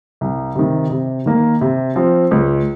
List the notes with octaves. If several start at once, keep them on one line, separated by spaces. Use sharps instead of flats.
C2
C3 D#3
C3
D#3 A#3
C3
F3 C4
C#2